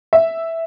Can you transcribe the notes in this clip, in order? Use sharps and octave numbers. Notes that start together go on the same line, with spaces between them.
E5